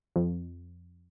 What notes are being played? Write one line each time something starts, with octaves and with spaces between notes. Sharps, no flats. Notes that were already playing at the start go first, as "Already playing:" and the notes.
F2